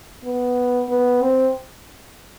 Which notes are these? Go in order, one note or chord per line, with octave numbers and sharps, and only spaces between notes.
B3
B3
C4